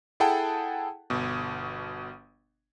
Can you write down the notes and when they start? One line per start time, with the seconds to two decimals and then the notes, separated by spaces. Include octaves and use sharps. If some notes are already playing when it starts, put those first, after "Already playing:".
0.20 E4 G#4 A4 F#5 G5 A5
1.10 G1 B2